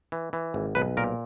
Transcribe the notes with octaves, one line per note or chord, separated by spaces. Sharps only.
E3
E3
G#1
B1 B4
A#2 A#4